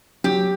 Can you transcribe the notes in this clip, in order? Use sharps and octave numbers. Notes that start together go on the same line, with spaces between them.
F#3 G4